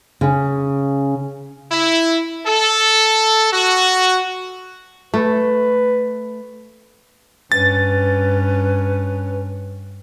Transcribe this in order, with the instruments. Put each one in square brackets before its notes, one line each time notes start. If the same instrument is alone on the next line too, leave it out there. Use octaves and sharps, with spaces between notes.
[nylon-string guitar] C#3
[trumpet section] E4
A4
F#4
[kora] A3 [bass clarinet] B4
[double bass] G2 C#4 [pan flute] B4 [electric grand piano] A6